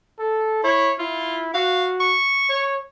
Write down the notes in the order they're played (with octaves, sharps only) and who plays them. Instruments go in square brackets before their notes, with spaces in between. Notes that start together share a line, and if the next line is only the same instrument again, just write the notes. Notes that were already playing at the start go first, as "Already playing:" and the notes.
[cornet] A4
[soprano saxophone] E4 [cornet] C#5
[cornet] E4 [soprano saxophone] F4
[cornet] F#4 [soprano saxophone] F5
[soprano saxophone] C#6
[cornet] C#5